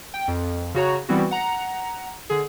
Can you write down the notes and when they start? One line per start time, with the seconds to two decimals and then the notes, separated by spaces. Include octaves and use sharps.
0.14 G5
0.28 F2
0.74 C#3 F#4 C#5 A#5
1.09 E3 G3 B3 C4 E4 F#4
1.31 F#5 A#5
2.30 D3 G#4